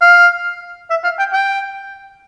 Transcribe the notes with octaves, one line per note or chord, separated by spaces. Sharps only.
F5
E5
F5
G5
G5